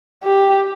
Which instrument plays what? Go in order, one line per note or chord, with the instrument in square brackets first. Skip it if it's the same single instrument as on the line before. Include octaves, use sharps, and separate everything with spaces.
[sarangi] G4